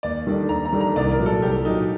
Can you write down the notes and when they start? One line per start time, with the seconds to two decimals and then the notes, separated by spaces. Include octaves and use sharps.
0.03 D#2 D5
0.27 D#3 G3 D4 A4
0.49 D#2 A#5
0.65 A#5
0.72 D#3 G3 D4 A4
0.80 A#5
0.96 C2 D5
1.11 A#4
1.19 A#2 F#3
1.26 A4
1.42 C2 G4
1.65 A#2 F#3 D#4